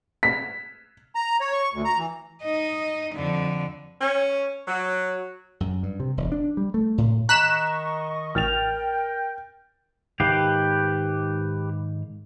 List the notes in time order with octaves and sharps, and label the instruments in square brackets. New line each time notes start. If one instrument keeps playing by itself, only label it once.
[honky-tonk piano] B6
[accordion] A#5
C#5
C#6
D2
A#5
E3
[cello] D#4 D#5
F2 D3
[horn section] C#4
F#3
[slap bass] F#2
G2
C3
E1
D4
G3
A3
A2
[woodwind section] D#3 D#5 C#6 [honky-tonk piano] A#5 [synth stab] F#6 B6 E7
[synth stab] A1 [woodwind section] A#4 G5 [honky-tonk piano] F6 A6 F7
[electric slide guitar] G#2 D#3 F5 [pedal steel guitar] G4 B4